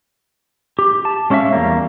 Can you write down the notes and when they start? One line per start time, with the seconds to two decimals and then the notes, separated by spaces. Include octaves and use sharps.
0.79 G4
1.05 A5
1.30 G#3 C#4 E4 F#4 E5 F5
1.52 E2 G3 A#3